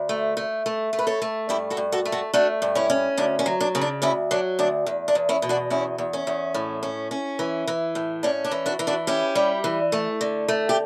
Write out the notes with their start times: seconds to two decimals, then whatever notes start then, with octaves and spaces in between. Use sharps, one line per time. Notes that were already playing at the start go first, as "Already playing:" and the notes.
Already playing: D2
0.09 A3
0.37 A3
0.66 A3
0.93 A3
0.99 B4
1.07 A4 C#5
1.22 A3
1.49 G2 E4 G4
1.70 F#4 A4
1.77 G2
1.92 F#4 A4
2.06 A3
2.12 F#4 A4
2.34 A3 D4 F#4
2.62 G2
2.75 C#4 E4
2.90 C#4
3.18 D2 D4
3.39 C#4
3.46 F#3
3.61 D4
3.75 C#3 C#4
3.81 D4
4.02 D2 C#4 E4
4.31 F#3 D4
4.59 D2 D4
4.87 E2
5.08 D4
5.15 E2
5.29 C#4 E4
5.42 B2
5.49 D4 F#4
5.70 E2 C#4 E4
5.98 E2
6.13 C#4
6.27 E2
6.54 A2
6.83 C#4
7.11 C#4
7.39 E3
7.68 E3
7.95 A2
8.23 C#4 D4
8.45 D4
8.52 E3
8.66 D4 F#4
8.79 E3
8.87 D4 F#4
9.07 C#4 E4 G4
9.35 G3
9.64 E3
9.92 A3
10.21 D3
10.48 A3
10.69 G4